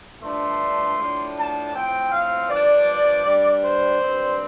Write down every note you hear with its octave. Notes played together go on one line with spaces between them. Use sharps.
G2 F3 A3 D4 C6
A2 F3 D4
A5
A2 F3 C4 G5
F5
G2 F3 D4 D5
G2 G3 D4
C5
G2 G3 C4